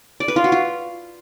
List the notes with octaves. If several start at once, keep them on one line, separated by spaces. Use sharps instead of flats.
D5
B4
F4
F#4
F4